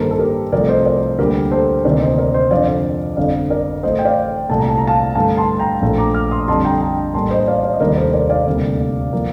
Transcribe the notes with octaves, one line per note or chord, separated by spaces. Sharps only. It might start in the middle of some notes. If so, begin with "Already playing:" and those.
Already playing: G2 D#3 G3 A#3 A4 C5
A4
G4 A#4
C2 C3 F3 A3 A#4 D5
C5 D#5
A#4 D5
D2 D3 G3 A#3 G4 A#4
A4 C5
D2 C3 D#3 A#3 A#4 D5
C5 D#5
A#4 D5
C5 D#5
F2 D3 F3 D5 F5
G1 F2 D3 D5 F5
A#4 D5
A1 A2 A3 C5 D#5
G5
D5 F5
C2 A#2 A3 A5
A#5
A5
A#5
F5 A5
G2 D3 A3 F5 A5
A5 C6
G5 A#5
A#1 A#2 F3 A3
A#5 D6
D6 F6
C6 D#6
F2 D3 G3 A5 C6
G5 A#5
G5 A#5
A1 A2 G3 A#3 A5 C6
C5 D#5
D5 F5
D5 F5
D#5
F1 D#2 D#3 G3 A#3 A#4 D5
A4 C5
A#4 D5
D5 F5
D2 C3 G3 A#3
F3 A#3